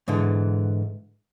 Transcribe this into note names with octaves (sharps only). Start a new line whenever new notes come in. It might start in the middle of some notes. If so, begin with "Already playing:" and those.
G#2 D3 E3